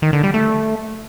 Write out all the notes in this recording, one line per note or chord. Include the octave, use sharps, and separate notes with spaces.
D#3
D3
G3
A3